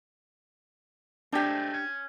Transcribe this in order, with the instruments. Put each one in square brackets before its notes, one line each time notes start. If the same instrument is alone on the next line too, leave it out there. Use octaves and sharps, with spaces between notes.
[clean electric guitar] G#3 A3 C4 [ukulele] D4 G4
[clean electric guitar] C#4